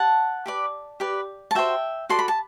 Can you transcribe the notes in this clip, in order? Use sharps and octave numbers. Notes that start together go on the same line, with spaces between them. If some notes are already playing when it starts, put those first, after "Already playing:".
Already playing: F#5 A5
G4 B4 D5
G4 B4 D5
A5
F#4 C5 E5 G5
F#4 A4 D5 C6
B5
A5